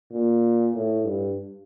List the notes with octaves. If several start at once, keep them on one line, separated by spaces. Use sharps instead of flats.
A#2
A2
G2